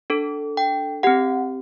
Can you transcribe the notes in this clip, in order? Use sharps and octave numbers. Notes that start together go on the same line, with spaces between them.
D4 A4
G5
C4 G4 F#5